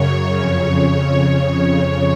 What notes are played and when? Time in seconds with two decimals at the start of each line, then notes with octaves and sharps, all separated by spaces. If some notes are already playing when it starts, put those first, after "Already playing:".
Already playing: F#2 C#3 C#5
0.36 F2 C#3 C#5